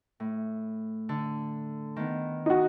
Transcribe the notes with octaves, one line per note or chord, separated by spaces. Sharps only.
A2
D3
D#3 B3
D#4 F#4